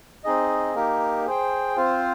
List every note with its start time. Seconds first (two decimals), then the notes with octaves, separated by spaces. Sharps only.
0.24 C4 D#4 G#4 D#5
0.75 A#3 D#4 G4 A#4
1.26 G#4 C5 G5
1.76 C4 F4 C5